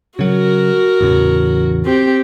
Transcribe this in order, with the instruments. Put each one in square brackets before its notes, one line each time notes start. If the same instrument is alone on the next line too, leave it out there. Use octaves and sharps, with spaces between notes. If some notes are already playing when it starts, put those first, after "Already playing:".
[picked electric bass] C#3 F#3 [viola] F#4 A#4
[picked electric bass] A1 E2 C#3
[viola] C4 G4